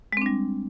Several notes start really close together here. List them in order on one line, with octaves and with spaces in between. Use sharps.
G#3 C4 D4 G3